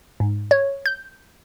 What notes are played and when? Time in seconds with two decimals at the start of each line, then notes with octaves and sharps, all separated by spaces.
0.20 G#2
0.51 C#5
0.86 G6